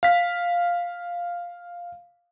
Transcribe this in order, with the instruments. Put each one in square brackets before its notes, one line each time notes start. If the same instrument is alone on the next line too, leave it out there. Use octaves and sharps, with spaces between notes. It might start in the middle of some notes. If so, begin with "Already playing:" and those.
[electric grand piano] F5 B6